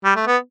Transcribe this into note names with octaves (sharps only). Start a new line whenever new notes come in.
G3
A3
B3